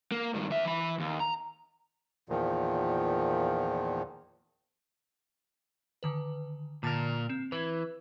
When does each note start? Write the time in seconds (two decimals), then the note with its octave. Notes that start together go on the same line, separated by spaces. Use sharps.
0.12 A#3
0.34 G2 D#3
0.50 E2 E5
0.65 E3 B5
1.00 D#2
1.20 A#5
2.29 E2 A#2 D#3 F3
6.03 D3 D#3 B4
6.83 A#2 D3 A#4 A5 A6
7.29 C4 C7 E7
7.52 E3 B4 G#6